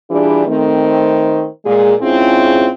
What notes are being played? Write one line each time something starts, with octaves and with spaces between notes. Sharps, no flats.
E3 G3 D4 F4 G#4
D#3 A3 C4
A#2 G#3 G#4
G#2 C4 C#4 E4 F4 G#4